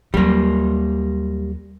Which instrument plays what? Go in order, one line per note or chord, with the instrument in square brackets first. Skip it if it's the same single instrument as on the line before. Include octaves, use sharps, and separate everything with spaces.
[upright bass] D#2 F#3 [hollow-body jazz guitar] G3 A#3